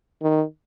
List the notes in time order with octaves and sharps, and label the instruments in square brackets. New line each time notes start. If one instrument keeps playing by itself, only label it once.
[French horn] D#3